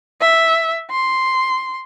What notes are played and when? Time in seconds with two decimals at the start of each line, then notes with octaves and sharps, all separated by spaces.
0.21 E5
0.91 C6